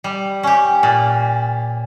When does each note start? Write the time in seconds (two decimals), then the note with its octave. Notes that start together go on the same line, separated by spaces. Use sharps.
0.04 G3
0.43 C#4 G4
0.83 A#2